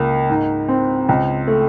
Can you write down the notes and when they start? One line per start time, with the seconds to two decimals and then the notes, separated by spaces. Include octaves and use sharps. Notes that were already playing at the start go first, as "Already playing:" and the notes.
Already playing: C#2 A#3
0.29 G#2
0.68 C4
1.09 C#2
1.48 A3